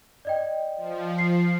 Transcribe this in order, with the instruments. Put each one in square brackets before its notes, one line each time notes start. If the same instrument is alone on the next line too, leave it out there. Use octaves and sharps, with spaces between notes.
[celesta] D5 D#5 G5
[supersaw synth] F3
[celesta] C7